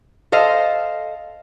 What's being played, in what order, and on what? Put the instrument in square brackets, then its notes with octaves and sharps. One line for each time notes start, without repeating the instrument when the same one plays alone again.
[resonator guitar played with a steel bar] A4 C5 D#5 F5